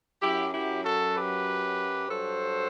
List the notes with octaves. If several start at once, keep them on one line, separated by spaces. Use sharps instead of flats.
F#2 F#3 E4 G4
E4 G4
F#4 A4
G4 B4
G2 F#3 A4 C5